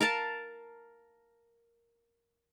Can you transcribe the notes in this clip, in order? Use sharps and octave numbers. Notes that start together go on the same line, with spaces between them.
A#4 F5 A5